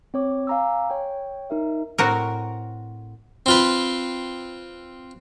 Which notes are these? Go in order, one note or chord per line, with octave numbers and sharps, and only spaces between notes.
C4 C#5 D6
F5 G#5 A#5 D6 E6
C#5 G5
D#4 A#4 E5
A2 C4 F#4 A#4
C4 F4 B4